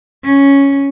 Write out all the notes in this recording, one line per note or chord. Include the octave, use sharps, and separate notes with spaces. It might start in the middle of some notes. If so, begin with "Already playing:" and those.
C#4